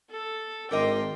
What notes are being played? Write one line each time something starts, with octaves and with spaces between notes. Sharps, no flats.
A4
G#1 D4 A#4 D#5 G5 C6